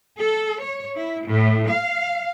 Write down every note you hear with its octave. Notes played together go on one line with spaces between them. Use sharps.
A4
C#5
E4
A2
F5